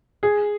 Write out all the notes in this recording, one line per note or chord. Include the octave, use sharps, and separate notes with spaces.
G#4